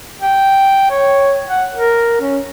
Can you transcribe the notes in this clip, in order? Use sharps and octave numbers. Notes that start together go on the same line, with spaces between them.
G5
C#5
F#5
A#4
C#4